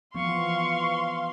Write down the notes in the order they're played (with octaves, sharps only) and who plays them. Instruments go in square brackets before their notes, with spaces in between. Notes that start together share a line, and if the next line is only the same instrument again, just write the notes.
[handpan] E3 F3 B3 [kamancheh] F5 C6 [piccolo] C#6